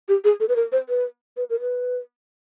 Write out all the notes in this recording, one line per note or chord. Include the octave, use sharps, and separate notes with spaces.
G4
G#4
A4
B4
A#4
C5
B4
B4
A#4
B4